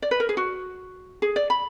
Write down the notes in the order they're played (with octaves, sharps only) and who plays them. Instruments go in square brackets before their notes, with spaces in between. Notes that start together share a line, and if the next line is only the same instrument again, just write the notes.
[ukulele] D5
B4
A#4
G#4
F#4
G#4
D5
B5